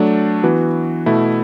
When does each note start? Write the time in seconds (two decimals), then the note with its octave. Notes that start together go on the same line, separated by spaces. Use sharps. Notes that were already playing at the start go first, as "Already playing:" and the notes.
Already playing: F#3 A3 D4
0.43 E3 B3 F#4
1.06 B2 A3 E4